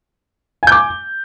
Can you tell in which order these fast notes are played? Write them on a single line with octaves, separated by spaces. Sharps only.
G#5 G6 D6